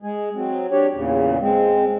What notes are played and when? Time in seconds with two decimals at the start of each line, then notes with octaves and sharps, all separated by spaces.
0.02 G#3 G#4
0.35 F#3 C4
0.71 D4 G4 C#5
0.94 E2 A#2 C#3
1.41 G#3 C4